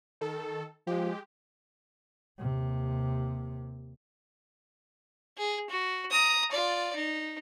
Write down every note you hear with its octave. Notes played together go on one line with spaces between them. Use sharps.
D#3 A4
F3 G#3 G4
D#2 C3
G#4
F#4
A#5 D#6
F4 D5
D#4